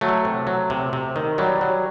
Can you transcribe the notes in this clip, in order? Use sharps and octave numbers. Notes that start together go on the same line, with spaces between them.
F#3 A3
C3
F#3
C3
C3
D#3
F#3 G3
F#3